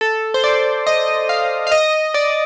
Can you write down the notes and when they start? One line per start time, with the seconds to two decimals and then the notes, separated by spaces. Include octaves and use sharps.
0.01 A4
0.34 C5
0.44 D5
0.87 D#5
1.29 F5
1.67 F5
1.72 D#5
2.14 D5